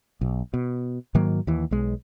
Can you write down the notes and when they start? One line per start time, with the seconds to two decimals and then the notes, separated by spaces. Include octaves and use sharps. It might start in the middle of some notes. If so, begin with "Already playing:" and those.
0.21 B1
0.54 B2
1.14 G#2 D#3 F#3 A#3
1.47 D#2 E3
1.71 B1 G#3